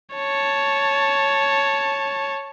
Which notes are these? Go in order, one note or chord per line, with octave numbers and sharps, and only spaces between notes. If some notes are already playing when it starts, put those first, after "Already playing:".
C#5 A5